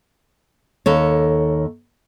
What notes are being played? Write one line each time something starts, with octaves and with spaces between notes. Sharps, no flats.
D#2 A4 C#5